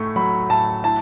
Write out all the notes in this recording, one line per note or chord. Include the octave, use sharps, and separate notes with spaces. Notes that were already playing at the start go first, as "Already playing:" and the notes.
Already playing: A2 A3 C#6
F#3 B5
A2 A5
E4 A5